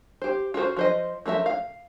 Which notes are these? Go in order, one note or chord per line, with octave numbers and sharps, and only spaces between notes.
G4 C5
F4 F#4 A#4 C5
F3 C5 D#5
F3 A3 A#4 E5
F5